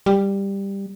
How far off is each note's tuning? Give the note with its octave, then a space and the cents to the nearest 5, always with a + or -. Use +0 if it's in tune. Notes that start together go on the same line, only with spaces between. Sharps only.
G3 +10